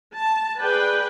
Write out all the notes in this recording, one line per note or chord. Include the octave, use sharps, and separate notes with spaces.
A5
G#4 B4 D5 G5